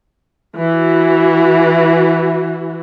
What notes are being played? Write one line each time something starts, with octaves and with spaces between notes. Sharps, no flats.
E3 F#4